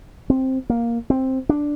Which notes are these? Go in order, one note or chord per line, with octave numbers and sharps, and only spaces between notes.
C4
A#3
C4
D4